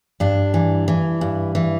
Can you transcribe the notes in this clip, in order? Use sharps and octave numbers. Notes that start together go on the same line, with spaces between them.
G2 D4
E3
E3
G2
E3